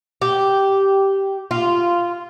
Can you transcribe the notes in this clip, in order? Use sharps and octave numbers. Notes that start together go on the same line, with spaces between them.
G4
F4